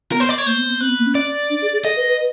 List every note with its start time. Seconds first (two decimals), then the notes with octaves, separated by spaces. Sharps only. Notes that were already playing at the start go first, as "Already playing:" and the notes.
0.12 B3 A#4
0.20 C5
0.29 D5
0.38 C#5
0.46 A#3 C5
0.58 B3
0.69 B3
0.81 C4 B4
0.89 B3
0.98 A#3
1.06 C#4
1.15 D5
1.50 D4
1.62 G#4
1.73 G#4
1.84 A4 D#5
1.96 B4
2.08 B4